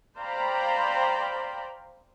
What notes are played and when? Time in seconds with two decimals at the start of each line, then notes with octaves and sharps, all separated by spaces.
0.18 C5 D5 F5 G5 A#5 B5